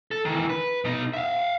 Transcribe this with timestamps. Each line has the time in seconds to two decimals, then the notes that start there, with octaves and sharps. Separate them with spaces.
0.11 A4
0.25 D#3 E3
0.50 B4
0.85 B2 D#4
1.13 E5 F5